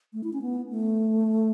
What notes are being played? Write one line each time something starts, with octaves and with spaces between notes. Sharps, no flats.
A3
E4
C#4
B3
A3